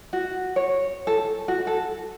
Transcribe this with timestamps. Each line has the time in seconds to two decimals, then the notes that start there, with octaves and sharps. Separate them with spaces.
0.13 F#4
0.56 C#5
1.07 A4
1.48 F#4
1.67 A4